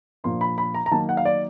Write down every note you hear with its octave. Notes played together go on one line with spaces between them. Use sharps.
A#2 F3 A#3 D4 C6
B5
B5
A#5
A#5
D#3 F#3 A#3 A5
F#5
F5
D5